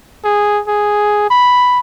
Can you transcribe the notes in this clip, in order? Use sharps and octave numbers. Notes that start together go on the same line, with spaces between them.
G#4
G#4
B5